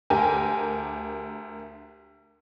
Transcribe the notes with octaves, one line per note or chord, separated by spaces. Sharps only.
D2 G4 A#4 G#5